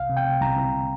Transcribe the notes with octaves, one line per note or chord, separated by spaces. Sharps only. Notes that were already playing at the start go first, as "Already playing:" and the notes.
Already playing: C2 F5
C3
G5
C3
C2 A#5
C2
C3